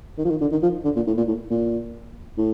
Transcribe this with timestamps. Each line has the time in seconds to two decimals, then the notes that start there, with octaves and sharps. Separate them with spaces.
0.18 D#3
0.25 F3
0.30 D#3
0.41 D3
0.52 D#3
0.63 F3
0.84 D3
0.96 A#2
1.07 A2
1.18 A#2
1.28 A2
1.50 A#2
2.38 A2